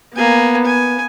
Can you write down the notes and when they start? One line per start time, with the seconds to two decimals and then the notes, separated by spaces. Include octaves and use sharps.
0.16 A#3 B3 G#5
0.65 G#5